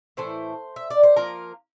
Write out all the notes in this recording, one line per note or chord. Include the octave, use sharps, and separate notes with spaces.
A2 E3 A3 E4 C5
E5
D5
C5
F3 A#3 F4 A#4